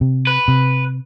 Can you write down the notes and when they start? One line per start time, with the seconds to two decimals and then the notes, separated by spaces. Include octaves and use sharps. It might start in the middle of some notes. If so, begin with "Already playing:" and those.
0.01 C3
0.27 B4
0.48 C3